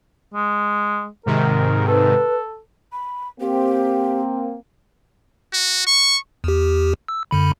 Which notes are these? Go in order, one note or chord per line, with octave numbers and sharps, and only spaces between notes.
G#3
G#2 C3 D#3 A#4
A4 B4
B5
A#3 C4 G4
F#4
C#6
E2 G4
E6
F#2 D3 B5